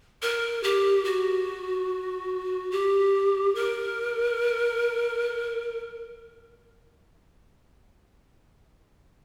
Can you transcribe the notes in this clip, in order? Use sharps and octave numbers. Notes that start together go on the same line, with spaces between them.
A#4
G4
F#4
G4
A#4